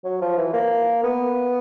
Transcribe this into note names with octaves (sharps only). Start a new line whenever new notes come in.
F#3
F3
E3
A#3
B3